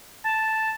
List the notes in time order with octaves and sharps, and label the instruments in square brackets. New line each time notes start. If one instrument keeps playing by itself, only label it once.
[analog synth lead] A5